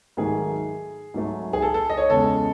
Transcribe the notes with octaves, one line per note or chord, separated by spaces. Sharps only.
G#2 D#3 F#3 A3 G#4
G#2 F#3 A3
G#4
A4
A4
D#5
C#5
E2 C#3 G#3 A4